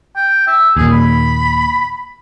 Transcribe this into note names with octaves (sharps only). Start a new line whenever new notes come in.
G5
E5
D#2 A#2 G#4
B5